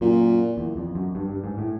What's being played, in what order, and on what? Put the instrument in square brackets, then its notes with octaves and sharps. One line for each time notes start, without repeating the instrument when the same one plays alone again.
[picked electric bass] F#2 [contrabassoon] A#2
[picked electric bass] E2
F2
F#2
G2
G2
G#2
A2